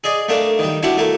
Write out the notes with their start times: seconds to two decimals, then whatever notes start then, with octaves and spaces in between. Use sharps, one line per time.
0.04 G#4 D5 D#5
0.28 A3 A#3 D4
0.59 D#3 G3
0.83 D4 E4 F#4 G4
0.97 A3 A#3